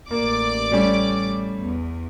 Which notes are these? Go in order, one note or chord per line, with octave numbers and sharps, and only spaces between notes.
A1 A#3 D5 D6
G3 A3 C#4
E2